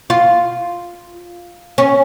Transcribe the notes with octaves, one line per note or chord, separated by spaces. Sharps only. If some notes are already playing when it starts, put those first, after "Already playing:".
F4
C#4